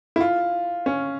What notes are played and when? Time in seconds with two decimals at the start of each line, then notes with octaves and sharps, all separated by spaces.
0.16 E4
0.21 F4
0.86 C#4